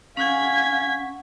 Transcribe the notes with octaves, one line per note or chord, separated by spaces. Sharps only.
C#4 F5 F#5 G#5 G#6 B6